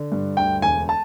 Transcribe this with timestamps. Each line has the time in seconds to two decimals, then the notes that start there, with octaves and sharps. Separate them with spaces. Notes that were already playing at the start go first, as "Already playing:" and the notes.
Already playing: D3
0.12 G2
0.37 D2 G5
0.62 E1 G#5
0.89 A5